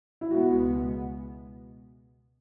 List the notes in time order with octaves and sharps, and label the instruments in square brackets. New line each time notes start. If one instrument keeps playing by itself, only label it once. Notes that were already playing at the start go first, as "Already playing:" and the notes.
[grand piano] E4
[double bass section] C#2 B2 G#3 B3 [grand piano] F#4